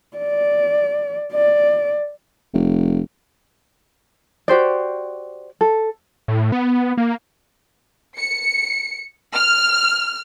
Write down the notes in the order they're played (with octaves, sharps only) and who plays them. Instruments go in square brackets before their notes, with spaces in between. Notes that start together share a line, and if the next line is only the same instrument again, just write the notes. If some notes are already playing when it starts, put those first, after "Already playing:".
[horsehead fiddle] D5
D5
[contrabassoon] F1
[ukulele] F#4 G4 C5 D5
A4
[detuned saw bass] A2
B3
A#3
[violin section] C#7
F6